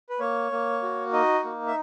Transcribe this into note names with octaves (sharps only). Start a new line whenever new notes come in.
B4
A#3 C#5
A#3
F#4
D#4 D#5
A#3
E5